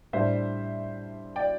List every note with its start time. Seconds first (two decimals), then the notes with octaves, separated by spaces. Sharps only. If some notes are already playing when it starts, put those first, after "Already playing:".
0.13 A2 G3 D4 C5 E5
1.36 D5 G5